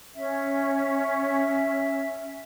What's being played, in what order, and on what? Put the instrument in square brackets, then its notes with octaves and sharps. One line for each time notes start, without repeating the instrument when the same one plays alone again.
[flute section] C#4 [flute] E5